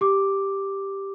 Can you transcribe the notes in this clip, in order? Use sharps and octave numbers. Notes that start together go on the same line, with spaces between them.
G4 D6